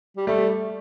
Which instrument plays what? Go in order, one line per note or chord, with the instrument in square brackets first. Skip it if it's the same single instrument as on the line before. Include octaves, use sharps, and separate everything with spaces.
[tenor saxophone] G3
[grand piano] G3 [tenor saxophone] A3